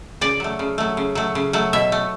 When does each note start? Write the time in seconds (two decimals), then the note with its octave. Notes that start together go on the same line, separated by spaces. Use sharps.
0.21 C#3 D5
0.40 F#3 A3
0.59 C#3
0.78 F#3 A3
0.97 C#3
1.15 F#3 A3
1.35 C#3
1.53 F#3 A3
1.73 B2 E5
1.92 A3